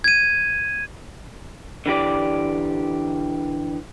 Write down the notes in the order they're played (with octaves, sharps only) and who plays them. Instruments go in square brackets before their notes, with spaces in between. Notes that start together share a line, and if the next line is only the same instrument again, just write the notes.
[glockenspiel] G#6 D#7
[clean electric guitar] D3 E3 G4 D5